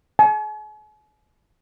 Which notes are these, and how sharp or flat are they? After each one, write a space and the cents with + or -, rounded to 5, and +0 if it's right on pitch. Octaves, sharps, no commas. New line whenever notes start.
G#5 +45